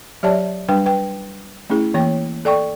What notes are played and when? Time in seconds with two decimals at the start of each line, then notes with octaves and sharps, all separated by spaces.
0.23 F#3 G4 C#5 D5 E5 A5
0.69 G3 D4 B4 G5
0.86 B4 G5
1.70 A3 C#4 E4 G#4
1.94 E3 A#3 C#5 G5
2.45 A4 D5 G5 C#6